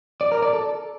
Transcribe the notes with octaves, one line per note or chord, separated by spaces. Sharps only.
D5
A#4
D5
A4